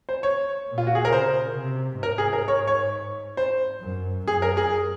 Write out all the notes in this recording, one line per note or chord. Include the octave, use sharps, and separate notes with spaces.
C5
C#5
A#2
F4
F#4
G#4
A#4
C#3 C5
C3
G#2 A#4
G#4
A#4
C#5
C#5
C5
F#2
F#2 G#4
A#4
G#4